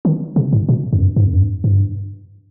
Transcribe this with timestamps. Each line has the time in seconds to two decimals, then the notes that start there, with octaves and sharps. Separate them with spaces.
0.05 D#3
0.36 C3
0.53 G#2
0.69 A#2
0.93 F2
1.00 G2
1.16 G2
1.25 F2
1.34 G2
1.64 G2